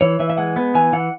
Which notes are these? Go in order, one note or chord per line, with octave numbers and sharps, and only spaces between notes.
E3 C#5
E3 E5
E5
G#3 F#5
B3
E3 G#5
E3 F#5